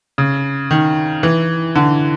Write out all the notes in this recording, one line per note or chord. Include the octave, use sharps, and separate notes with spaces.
C#3
D#3
E3
D3